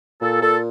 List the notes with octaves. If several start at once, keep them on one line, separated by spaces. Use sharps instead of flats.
A#2 A4
A#2 A4